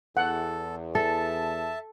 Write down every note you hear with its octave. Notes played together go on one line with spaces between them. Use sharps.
E2 A4 F#5
A4 E5 A5